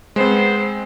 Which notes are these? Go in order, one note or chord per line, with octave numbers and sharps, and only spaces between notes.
G#3 B3 C4 C5